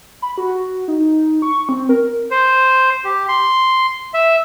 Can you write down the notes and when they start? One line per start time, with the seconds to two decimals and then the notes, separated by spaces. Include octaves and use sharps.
0.22 B5
0.38 F#4
0.88 D#4
1.42 C#6
1.69 C4
1.89 A#4
2.31 C5
3.04 G4
3.29 C6
4.14 E5